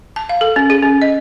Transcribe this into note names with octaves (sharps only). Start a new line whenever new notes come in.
A5
F5
A4
C#4
G#4
C#4
D#5